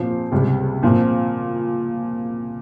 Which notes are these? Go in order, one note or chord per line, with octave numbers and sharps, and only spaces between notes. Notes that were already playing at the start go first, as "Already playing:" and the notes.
Already playing: A#2 F3 C4 C5
C#2 C3 G3
A#2 F3 C4 F4